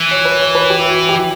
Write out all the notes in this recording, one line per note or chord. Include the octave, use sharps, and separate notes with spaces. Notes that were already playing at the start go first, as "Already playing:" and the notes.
Already playing: E3
C#5
B4
C#5
B4
G4
F#4
G4